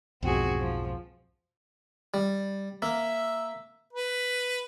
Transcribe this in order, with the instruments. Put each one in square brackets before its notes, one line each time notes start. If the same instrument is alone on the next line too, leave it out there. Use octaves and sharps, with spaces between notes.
[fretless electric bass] B1 F2 G#2 [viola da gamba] C4 F#4 G#4
[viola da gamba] F3
[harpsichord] G3
[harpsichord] A#3 [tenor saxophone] E5
[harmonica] B4